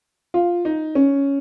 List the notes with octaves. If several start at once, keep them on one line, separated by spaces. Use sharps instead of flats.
F4
D#4
C#4